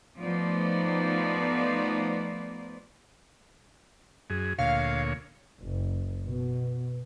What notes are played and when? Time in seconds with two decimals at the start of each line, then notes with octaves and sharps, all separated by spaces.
0.19 F3 A3 B3 D#4 C5 D5
4.30 F#2 G#4
4.58 D2 A#2 C#5 F5
5.60 F#1
6.27 B2